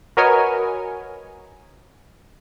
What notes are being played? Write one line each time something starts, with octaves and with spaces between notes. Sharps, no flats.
F#4 A#4 B4 C#5 D#5 G#5